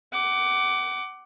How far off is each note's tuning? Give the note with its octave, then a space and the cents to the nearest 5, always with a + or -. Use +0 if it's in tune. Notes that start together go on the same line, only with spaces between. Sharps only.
F#5 +30 D6 +0